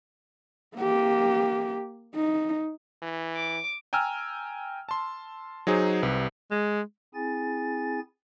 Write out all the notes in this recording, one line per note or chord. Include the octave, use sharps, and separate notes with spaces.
A#3 G4
D#4
E3
D6
G5 G#5 A#5 E6 F6
A5 C6
F#3 D#4 G#4 C5
C2 C3 B4
G#3
C4 E4 G#4 G#5 A6